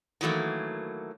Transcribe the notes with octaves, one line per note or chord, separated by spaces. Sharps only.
D#3 E3 F#3 A3 A#3